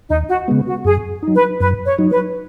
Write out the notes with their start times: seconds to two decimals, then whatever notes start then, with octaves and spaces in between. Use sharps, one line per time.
0.09 D#2 D#4
0.29 F#4
0.48 C#3 G#3 B3
0.67 F#4
0.85 F#2 G#4
1.23 F#3 D#4
1.35 B4
1.60 F#2 B4
1.85 C#5
1.98 F#3 D#4
2.10 B4